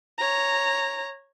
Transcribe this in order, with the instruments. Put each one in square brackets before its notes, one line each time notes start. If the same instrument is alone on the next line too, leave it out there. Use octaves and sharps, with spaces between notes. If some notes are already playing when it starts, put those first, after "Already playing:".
[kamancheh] C#5 A#5